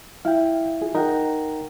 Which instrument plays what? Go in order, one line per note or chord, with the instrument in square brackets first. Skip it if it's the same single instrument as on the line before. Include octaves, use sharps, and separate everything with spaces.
[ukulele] E4 [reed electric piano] F5 G5
[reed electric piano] F4 G#4
[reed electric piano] D#4 F#5 G5 [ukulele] A#4